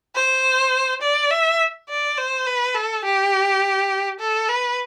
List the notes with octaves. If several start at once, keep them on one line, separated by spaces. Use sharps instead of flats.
C5
D5
E5
D5
C5
B4
A4
G4
A4
B4